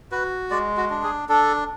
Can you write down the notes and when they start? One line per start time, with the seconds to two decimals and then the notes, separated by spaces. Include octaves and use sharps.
0.12 F#4 B4
0.51 G#3 D5
0.77 F#4
0.90 D4
1.03 G#4
1.29 D4 A4